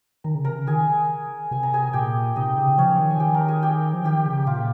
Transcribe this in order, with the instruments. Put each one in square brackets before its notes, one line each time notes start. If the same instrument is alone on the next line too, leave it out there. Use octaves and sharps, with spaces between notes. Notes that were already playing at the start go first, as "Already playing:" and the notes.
[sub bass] D#3 [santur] A#5
[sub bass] C#3
[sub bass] C3 [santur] A#4 A#5
[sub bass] C#3
[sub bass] D#3 [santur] G#4 G#5
[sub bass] C3 [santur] G#5
[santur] A#5
G#4 G#5
[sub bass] A#2 [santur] G4 G5
[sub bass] C3 [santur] D#4 D#5
[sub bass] C#3
[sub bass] F3 [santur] C#4 C#5
[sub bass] D#3
[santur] G#5
G4 G5
A#4 A#5
G#4 G#5
G4 G5
[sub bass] F3
[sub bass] D#3 [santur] G4 G5
[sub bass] C#3
[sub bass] A#2 [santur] F4 F5